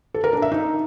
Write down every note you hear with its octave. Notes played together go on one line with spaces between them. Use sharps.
A4
A#4
D4
E5
D#4